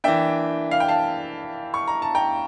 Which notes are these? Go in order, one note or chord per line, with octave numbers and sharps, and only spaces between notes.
E3 A#3 D4 E5 G5
F5
G5
F5 A5
C#6
A#5
A5
G5 A#5